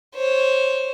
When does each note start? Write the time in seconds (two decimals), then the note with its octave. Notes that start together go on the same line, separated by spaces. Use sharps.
0.15 C5 C#5